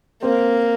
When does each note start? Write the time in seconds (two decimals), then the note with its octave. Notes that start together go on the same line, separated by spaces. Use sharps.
0.22 A#3 C4